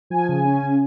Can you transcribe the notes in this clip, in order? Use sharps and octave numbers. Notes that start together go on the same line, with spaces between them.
F3 G#5
C#3
C#4
C#3